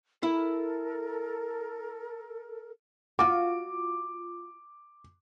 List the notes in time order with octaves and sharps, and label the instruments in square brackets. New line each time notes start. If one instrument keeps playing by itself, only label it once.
[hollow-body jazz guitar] E4 [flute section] A4 A#4
[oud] F4 F#4 [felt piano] D6